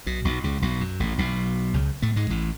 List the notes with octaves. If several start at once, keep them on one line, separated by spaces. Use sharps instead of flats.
B1 B2
B1 B2
C#2 C#3
B1 B2
F#2
A1 A2
B1 B2
C#2 C#3
A2 A3
G#2 G#3
A1 A2